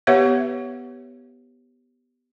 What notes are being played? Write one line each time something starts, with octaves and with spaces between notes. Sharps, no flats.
B3 G4 B4 C#5 E5 F#5